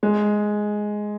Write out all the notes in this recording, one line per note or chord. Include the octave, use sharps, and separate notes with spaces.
G#3